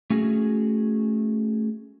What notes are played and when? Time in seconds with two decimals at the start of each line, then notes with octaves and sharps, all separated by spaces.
0.10 A3 C#4 F#4 G#4